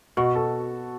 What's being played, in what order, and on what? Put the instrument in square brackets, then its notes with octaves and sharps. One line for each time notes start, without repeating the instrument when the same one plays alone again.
[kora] B2 [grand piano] F#4
[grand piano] A4